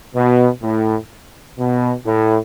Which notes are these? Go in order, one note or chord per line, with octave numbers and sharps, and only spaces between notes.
B2
A2
B2
A2